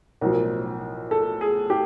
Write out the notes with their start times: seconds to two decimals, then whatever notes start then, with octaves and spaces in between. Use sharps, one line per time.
0.21 B1 A2 F3 A#4
1.11 A4
1.41 G#4
1.70 G4